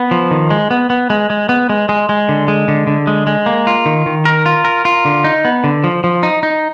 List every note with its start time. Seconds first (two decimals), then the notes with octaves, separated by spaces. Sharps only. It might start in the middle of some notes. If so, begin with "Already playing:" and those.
Already playing: B3
0.11 F3
0.31 D#3
0.50 G#3
0.71 B3
0.90 B3
1.10 G#3
1.30 G#3
1.49 B3
1.69 G#3
1.89 G#3
2.09 G#3
2.29 D3
2.48 G#3
2.68 D3
2.87 D3
3.07 G#3
3.27 G#3
3.46 A#3
3.67 F4
3.86 D#3
4.06 D#3
4.25 A#4
4.46 F4
4.65 A#4
4.85 F4
5.05 D3
5.24 D#4
5.45 B3
5.64 D3
5.84 F3
6.04 F3
6.23 D#4
6.43 D#4